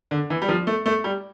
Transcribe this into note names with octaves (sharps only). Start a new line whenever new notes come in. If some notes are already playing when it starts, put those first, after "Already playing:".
D3
E3
G3
F3
A3
A3
G3